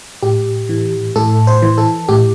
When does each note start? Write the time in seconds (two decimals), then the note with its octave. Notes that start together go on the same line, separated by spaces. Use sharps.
0.23 A2 G4
0.69 E3
1.16 A2 A4
1.47 C5
1.62 E3
1.78 A4
2.09 A2 G4